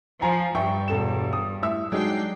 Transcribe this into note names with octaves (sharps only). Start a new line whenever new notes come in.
F3 G#5 A#5
G2 E5 G5 C#6
E1 A4 E7
D#6
A2 E5 E6
F#3 G#3 D4 D#4 G5 C7